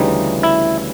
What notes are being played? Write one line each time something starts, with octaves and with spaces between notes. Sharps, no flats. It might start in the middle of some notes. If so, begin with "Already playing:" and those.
Already playing: D2 C#3 E3 G3 D#4
E4